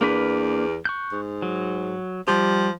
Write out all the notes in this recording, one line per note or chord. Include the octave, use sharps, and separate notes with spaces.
E2 A#3 D4 B4
C#6 F#6 G6
G#2
F#3
F3 G3 G4